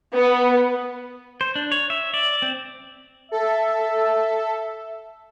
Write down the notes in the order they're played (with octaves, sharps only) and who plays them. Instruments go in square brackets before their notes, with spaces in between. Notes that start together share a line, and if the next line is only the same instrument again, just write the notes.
[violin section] B3
[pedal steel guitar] C5
D4
C#5
E5
D5
C4
[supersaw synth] A4 [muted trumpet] E5